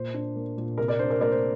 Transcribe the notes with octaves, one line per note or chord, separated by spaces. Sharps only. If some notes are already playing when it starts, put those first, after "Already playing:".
Already playing: A#2 C5
D4
A#3
A#2
C3 A#4
A#4 D5
D4 C5
A#4
A#3 A#4 D5
C5